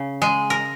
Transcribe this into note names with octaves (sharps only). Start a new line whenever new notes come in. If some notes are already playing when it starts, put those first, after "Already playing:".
Already playing: C#3
G#3
A#4